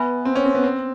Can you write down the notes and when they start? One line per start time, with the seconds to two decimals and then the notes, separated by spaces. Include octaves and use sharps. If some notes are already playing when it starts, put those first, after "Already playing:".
Already playing: B3 B4 E5 G#5 B5
0.25 C4
0.36 C#4
0.45 C4
0.55 B3
0.64 C4